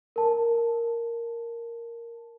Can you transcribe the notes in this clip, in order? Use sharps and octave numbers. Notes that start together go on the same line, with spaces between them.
A#4 A5